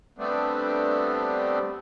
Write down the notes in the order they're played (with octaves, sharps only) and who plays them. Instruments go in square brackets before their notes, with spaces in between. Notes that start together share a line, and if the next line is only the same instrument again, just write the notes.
[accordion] G3 A3 B3 C4 D4